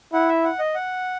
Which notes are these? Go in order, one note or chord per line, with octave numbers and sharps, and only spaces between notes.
E4 F#5
E5
F#5
D#5
F#5